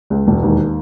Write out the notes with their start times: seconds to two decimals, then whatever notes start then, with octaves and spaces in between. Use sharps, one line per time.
0.10 C#2
0.27 E1
0.43 D#2